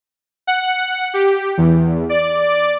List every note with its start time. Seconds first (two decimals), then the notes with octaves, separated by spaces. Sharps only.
0.47 F#5
1.14 G4
1.58 E2
2.09 D5